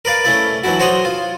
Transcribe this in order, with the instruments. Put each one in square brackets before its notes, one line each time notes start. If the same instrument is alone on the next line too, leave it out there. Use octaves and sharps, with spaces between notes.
[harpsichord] A#4 B4 D5 F5
A3 C#4 E4 D5
E3 F#3 D4 E4 F#4
F#4 C5 C#5 F#5 C6 D#6
F4